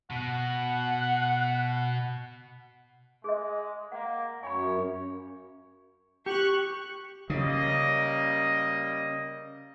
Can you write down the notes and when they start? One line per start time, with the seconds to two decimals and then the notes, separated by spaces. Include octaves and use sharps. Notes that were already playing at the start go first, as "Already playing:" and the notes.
0.11 B2 F#5
3.24 G#3 G#4 D#5
3.92 A#3 F#5
4.43 F#2 C#5 G#5 B5
6.26 G4 C#6 F#6
7.30 C#3 G3 A#3 D#5